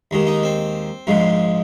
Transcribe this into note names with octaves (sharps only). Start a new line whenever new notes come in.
D#2 D#3 G#3
D#4
C4
A#1 G#2 F3 G#3